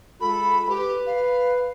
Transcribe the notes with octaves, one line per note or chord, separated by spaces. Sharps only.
G#3 F4 A4 B5
G4 B4
F5